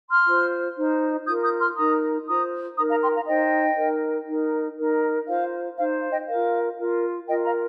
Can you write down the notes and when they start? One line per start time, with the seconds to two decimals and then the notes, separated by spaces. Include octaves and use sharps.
0.10 C6 F6
0.27 F4 C5
0.77 D#4 C5
1.27 F4 D#6 G6
1.30 A#4
1.43 D#6 G6
1.60 C6 F6
1.77 D#4 A#4 A#5 D#6
2.27 F4 C5 A#5 D#6
2.77 D#4 A#4 A#5 D#6
2.90 F5 A#5
3.02 G5 C6
3.15 F5 A#5
3.27 D#4 C5 D#5 G5
3.78 D#4 A#4
4.28 D#4 A#4
4.78 D#4 A#4
5.28 F4 C5 F5
5.78 D#4 C5 F5
6.11 D#5 G5
6.28 F4 A#4 F5
6.78 F4 A#4
7.28 F4 A#4 D#5 G5
7.45 F5 A#5